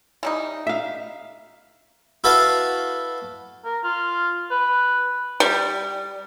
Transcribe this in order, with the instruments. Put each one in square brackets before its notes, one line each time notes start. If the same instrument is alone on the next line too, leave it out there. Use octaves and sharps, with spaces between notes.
[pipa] E3 G3 D#4
[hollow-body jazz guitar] E5 F5
[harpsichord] E4 F#4 A4 B4 E5 F5
[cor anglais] A#4
F4
B4
[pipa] G3